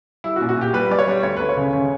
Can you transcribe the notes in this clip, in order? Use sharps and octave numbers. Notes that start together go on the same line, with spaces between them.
G3 E4
F#4
A#2
F#4
A#2 G4
G3 B4
G3 D5
C#5
G3
D2 C#5
D2 B4
C#5
C#3
C#3